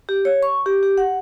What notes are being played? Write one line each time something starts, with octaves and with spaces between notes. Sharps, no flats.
G4
C#5
C#6
G4
G4
F#5